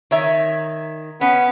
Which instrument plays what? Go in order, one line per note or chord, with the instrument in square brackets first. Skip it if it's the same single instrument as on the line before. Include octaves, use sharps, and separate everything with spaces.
[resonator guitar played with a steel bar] D#3 C#5 E5
[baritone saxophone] B3 [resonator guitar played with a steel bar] C#4